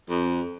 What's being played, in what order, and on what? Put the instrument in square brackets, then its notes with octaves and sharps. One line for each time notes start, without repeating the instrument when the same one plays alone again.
[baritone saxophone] F2